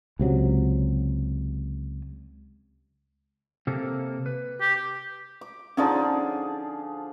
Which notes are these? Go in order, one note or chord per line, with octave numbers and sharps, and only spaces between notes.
C#2 C3 F#3
C3 A#3 A4
B4
G4
D6
D3 F3 C#4 D#4 G#4 D5